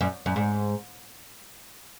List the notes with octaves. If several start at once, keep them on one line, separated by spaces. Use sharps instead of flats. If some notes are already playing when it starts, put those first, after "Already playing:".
F#2
F#2
G#2